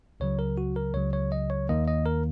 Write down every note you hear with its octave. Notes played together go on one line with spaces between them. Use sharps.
C#2 C#3 F#3 C#5
A#4
F#4
A#4
C#2 C#3 F#3 C#5
C#5
D#5
C#5
D#2 D#3 A#3 D#5
D#5
A#4